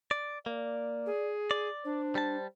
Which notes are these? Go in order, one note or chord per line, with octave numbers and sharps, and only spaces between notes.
D5
A#3 D5
G#4
D5
D4 C5
G3 A5